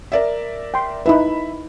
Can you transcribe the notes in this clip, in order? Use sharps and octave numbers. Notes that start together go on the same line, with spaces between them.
A#4 D5 E5
G5 C6
D#4 E4 B4 E5 B5